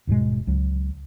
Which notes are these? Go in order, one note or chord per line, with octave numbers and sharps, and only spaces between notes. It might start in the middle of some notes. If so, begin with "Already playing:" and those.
D#1 G#2 B2 G#3
C#2 F#3